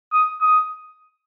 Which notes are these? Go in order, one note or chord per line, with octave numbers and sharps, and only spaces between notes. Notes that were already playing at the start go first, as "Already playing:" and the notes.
D#6
D#6